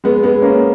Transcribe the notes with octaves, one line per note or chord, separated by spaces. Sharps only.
G#3 B3
G#3 B3
A#3 C#4